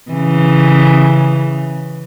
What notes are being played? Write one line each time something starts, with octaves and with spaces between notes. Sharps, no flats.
C#3 E3